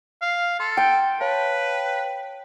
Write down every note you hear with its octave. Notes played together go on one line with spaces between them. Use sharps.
F5
A4 C6
G5
B4 C#5 F5 A5